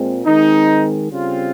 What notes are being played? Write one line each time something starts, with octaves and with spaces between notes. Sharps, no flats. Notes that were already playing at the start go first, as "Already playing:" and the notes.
Already playing: A#2 G#3 C4
D#3 G#3 C4 D#4
C#3 G3 C4 F4